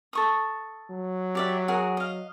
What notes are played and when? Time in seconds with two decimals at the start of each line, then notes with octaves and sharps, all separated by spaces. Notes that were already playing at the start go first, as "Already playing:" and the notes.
0.13 A4 C#6 D#6
0.90 F#3
1.35 G4 D5 E5
1.68 F#4 G#4 A#4
1.97 D#5 F5